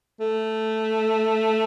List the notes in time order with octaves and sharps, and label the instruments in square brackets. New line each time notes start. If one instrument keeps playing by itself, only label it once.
[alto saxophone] A3